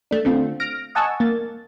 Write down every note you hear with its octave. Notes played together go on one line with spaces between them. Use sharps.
A3 D4
D3 A3 C4 F4
F6 A#6 D7
D#5 F#5 G#5 A5 C#6 E6
A#3 A6